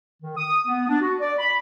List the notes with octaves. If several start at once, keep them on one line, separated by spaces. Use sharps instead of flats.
D#3
D#6
B3
D4
F#4
D5
B5